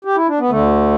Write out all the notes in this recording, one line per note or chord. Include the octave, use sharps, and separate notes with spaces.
G4
E4
D4
B3
D2 D3 A3